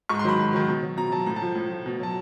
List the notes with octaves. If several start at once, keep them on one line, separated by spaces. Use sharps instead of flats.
G#2 C#6
C6
D#3 F#3 B5
G#2
D#3 F#3
B2
F#3
B2 A#5
F#3 A5
A2 A#5
A5
F3
A2
F3
B2
F#3 A5